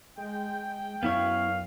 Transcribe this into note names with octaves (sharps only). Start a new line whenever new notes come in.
G#3 G5
F#2 B3 E4 C#5 F5